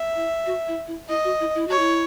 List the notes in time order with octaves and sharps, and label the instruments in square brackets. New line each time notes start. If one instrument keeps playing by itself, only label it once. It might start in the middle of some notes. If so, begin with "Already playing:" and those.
Already playing: [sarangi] E5
[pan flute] E4
F#4
E4
E4
[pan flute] E4 [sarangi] D#5
[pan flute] F#4
E4
E4
[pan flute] F#4 [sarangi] C#5
[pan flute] E4